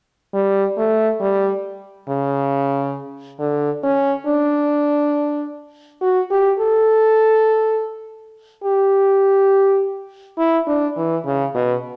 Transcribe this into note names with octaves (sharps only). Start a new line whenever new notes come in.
G3
A3
G3
C#3
D3
C#4
D4
F#4
G4
A4
G4
E4
D4
E3
C#3
B2